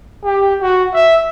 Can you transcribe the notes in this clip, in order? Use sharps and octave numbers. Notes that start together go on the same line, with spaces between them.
G4
F#4
E5